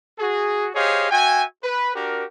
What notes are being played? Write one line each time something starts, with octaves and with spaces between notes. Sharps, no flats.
F#4 G#4
G4 G#4 C5 C#5 D#5 F5
F#4 E5 G5 G#5
B4
D4 F#4 G4 A#4